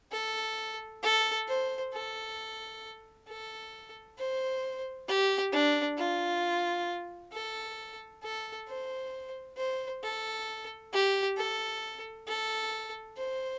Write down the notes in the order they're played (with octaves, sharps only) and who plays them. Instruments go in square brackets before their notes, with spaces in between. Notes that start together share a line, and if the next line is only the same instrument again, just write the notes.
[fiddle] A4
A4
C5
A4
A4
C5
G4
D4
F4
A4
A4
C5
C5
A4
G4
A4
A4
C5